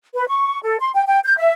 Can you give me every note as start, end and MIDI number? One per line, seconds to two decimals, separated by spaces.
0.14 0.27 71
0.28 0.60 85
0.63 0.77 69
0.79 0.89 84
0.94 1.03 79
1.07 1.19 79
1.24 1.36 91
1.38 1.53 76